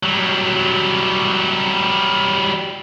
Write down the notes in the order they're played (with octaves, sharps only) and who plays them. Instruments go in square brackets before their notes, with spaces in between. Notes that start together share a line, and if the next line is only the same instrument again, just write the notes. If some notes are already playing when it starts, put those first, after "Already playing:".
[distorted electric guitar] F#3 G3